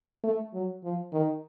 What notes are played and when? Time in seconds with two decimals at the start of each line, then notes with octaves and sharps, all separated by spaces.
0.24 A3
0.54 F#3
0.84 F3
1.13 D#3